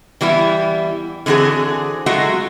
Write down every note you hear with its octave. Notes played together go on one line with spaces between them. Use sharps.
E3 G3 B3 E4
D3 E3 C4 F#4 G#4
F#3 G#3 A3 F4 F#4